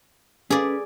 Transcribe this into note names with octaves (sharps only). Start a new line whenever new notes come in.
C#4 G#4 A4 B4 D5